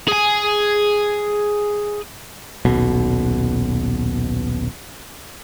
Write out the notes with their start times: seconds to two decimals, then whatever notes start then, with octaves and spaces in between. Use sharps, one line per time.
0.08 G#4 G#5
2.65 D#1 B1 B2